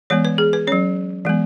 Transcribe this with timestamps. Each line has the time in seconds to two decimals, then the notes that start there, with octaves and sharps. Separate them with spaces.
0.10 E3 G#3 B3 C#5
0.25 B4
0.38 G#4
0.53 B4
0.67 F#3 C#4 C#5
1.25 E3 G#3 B3